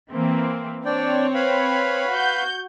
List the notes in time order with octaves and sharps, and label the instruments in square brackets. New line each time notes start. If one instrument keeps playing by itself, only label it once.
[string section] E3 A#3 C4
[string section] C4 C#5 [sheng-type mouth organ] D4 D5 G5
[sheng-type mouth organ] B4 F5 B5
[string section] F#4 G6